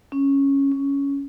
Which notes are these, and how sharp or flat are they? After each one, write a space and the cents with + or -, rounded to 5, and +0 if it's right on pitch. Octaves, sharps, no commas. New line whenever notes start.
C#4 -5
C#4 +10